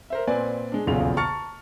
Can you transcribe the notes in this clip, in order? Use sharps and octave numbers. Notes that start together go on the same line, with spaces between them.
A#4 C5 E5
A#2 C4 B4 D5 G#5
G#3 D4
D#1 B1 E2 C#3 F4 F7
A5 A#5 C#6 F6 A6 C#7